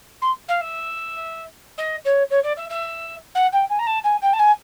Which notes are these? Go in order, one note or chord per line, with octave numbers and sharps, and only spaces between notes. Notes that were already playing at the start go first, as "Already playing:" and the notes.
C6
F5
E5
D#5
C#5
C#5
D5
E5
E5
F#5
G5
G#5
A#5
A5
G#5
G5
A5
G#5